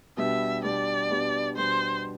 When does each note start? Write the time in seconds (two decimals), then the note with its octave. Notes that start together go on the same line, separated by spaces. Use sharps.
0.17 B2 G3 B3 D4 G4 E5
0.64 B2 G3 B3 D4 G4 D5
1.10 B2 G3 B3 D4 G4
1.56 B2 G3 B3 D4 G4 C5